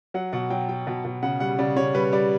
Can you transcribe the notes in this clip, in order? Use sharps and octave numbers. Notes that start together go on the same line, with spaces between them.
F#3 F#5
B2 F#5
F#3 G5
F#3 G5
B2
B2
C#3 F#5
G3 F#5
C#3 D5
C#3 C#5
G3 B4
G3 D5